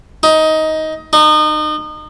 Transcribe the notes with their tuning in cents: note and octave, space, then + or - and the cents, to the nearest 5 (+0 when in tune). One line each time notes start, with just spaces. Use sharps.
D#4 +15
D#4 -30